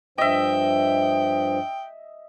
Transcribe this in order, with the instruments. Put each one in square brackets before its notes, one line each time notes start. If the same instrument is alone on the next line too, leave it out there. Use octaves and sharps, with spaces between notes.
[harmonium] G2 F3 [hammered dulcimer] D#5 E5 [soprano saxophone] G5